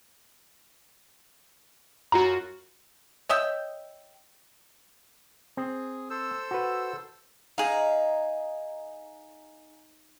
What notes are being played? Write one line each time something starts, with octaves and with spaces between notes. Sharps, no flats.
F#2 F4 F#4 A#5
C#5 D#5 E5 G5
C4 G#4
A4 C5 E6
F#4 B4
D#4 G#4 F5